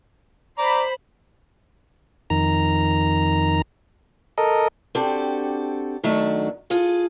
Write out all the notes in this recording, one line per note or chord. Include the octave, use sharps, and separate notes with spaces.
C5 D5 A#5 B5
F2 D#3 A#5
A4 A#4 D#5
C4 D4 F#4 G4 A4
D#3 F#3 A3 D4
F4 G#4 A4